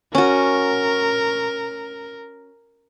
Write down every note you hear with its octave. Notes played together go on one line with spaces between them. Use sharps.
C#4 F#4 A#4